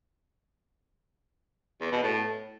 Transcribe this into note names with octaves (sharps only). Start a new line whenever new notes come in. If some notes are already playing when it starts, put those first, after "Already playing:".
E2
B2
A2